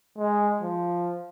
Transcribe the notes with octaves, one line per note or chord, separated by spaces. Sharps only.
G#3
F3